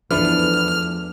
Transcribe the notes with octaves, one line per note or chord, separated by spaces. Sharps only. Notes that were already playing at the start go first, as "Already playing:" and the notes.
E2 F3 A3 D4 B4 F6